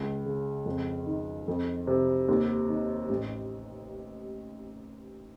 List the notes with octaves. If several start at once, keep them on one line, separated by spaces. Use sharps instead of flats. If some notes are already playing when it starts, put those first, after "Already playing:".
Already playing: C#2
C#3
F2
D#3
F2
C3
D#2
D#3
A1